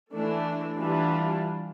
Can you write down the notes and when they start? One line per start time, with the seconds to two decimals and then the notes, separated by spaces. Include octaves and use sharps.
0.12 E3 A3 D4 A4
0.79 E3 G3 D4 F4